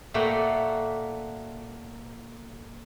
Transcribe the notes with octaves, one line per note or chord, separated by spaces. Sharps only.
A#2 A3 A#3 F#4 G5 B5